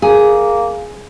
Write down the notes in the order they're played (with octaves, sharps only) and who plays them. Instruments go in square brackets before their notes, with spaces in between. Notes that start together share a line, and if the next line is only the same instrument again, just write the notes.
[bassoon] A#3 [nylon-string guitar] G#4